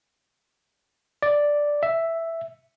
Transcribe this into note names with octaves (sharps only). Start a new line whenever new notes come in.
D5
E5